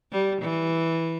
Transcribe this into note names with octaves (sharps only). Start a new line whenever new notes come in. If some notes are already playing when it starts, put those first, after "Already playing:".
G3
E3